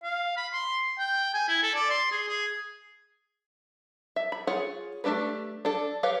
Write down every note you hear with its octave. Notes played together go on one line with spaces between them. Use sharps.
F5
B5
C6
G5
G#5
E4
A4
D5
C6
G#4
G#4
E5
B5
F4 G#4 C#5 F#5
A3 A#3 D4 G4 B4
D4 A4
G4 B4 C#5 F5